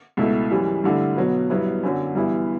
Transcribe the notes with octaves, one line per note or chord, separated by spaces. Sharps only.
C#2 B2 A3 E4
F#2 E3 G3
G2 D3 A3 E4
B2 F#3 B3
G2 F#3 B3 E4
F#2 D3 F#3
G2 E3 B3 E4